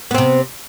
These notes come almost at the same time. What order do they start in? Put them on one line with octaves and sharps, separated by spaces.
B3 C4 C3